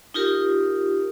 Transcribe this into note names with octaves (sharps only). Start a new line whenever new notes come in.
D#4 F4 G4 A#4